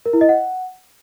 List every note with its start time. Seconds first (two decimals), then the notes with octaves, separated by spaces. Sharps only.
0.06 A#4
0.13 E4
0.21 D#5
0.29 F#5